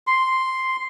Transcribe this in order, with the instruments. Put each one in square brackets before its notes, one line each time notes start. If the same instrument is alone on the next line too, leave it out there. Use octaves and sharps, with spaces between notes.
[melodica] C6